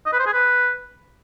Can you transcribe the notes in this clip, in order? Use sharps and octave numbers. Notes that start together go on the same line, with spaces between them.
D#5
B4
C5
G#4
B4